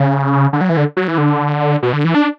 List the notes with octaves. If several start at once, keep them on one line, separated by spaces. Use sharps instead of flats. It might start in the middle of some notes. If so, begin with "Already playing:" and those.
Already playing: C#3
D3
F#3
E3
D3
F#3
E3
D3
B2
D3
E3
D4